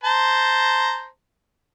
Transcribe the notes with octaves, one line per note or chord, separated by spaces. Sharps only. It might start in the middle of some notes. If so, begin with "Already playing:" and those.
C5 A5 A#5